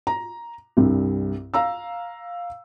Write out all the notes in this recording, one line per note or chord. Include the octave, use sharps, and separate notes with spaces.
A#5
C2 G2
F5 A#5 E6